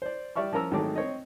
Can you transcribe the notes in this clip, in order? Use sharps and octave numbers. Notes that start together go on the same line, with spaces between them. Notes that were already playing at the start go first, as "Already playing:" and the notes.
C5 D5
G3 D5 E5 C#6 F6
F3 C#4 A#4 A#5 E6
G#1 D#3 F#3 G#3 A3 D6
C4 C#5 D#5